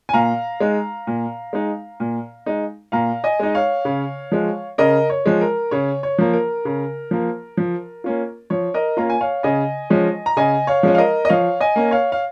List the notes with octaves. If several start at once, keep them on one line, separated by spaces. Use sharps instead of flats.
G#5
A#2 F5 A#5
G#3 D#4
A#2
G#3 D#4
A#2
G#3 D#4
A#2 F5 A#5
D#5 G#5
G#3 D#4
C#5 F5
C#3
F3 G#3
C#3 A#4 D#5
C#5
F3 G#3
A#4
C#3 C#5
C#5
F3 A#3
A#4
C#3
F3 A#3
F3
A#3 C#4 F4
F3 C#5
A#4 D#5
A#3 C#4 F4 A#5
G#5
C#5 F5
C#3 D#5 G#5
F3 G#3 C#4
A#5
C#3 D#5 G#5
C#5 F5
F3 G#3 C#4
F5
A#4 D#5
D#5
F3 C#5 F5
D#5 G#5
A#3 C#4
C#5 F5
F5